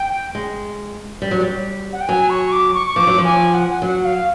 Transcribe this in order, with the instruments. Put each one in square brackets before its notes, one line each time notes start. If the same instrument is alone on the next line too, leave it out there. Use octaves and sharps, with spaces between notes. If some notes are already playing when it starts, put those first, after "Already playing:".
Already playing: [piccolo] G5
[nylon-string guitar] G#3
G3
F#3
G3
[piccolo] F#5
G5
[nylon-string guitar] F#3 [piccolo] G#5
[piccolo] C#6
D6
C#6
C#6
[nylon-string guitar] F3 [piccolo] D6
[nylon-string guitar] F#3
F3
[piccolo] G#5
F#5
[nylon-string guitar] F#3 [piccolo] F#5
[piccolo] F5